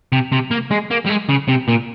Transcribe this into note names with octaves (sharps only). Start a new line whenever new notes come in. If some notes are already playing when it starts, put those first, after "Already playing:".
C3
C3
A#3
G#3
A#3
G3
G#3
C#3
C3
A#2